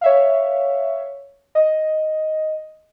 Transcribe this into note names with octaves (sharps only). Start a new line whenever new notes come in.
C#5 E5 F5
D#5